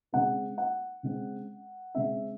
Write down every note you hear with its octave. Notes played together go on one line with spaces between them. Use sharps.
C#3 G#3 C4 F#5
F#5
C#3 G#3 C4
C#3 G#3 C4 E5